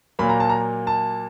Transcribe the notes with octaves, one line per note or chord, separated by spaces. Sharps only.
A#2 F#3 A#3 B5
A#5
A5
A#5
A5